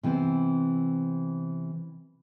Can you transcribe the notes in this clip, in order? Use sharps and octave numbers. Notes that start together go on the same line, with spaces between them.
C3 E3 B3 C4